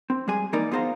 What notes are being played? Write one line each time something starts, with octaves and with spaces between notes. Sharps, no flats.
C4
G3 G#3 G#4 G#5
E3 A#3 D#4 A#4 D5
B3 F4 G#4 C5 F5 A#5